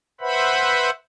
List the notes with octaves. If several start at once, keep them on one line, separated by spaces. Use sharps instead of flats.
B4 C5 E5 F#5 B5